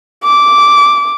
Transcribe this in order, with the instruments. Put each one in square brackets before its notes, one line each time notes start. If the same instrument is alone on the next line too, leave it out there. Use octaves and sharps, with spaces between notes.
[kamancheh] D6